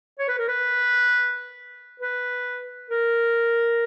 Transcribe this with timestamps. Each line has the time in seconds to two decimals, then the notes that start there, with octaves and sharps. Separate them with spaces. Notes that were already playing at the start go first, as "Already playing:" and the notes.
0.19 C#5
0.29 B4
0.38 A#4
0.48 B4
2.00 B4
2.90 A#4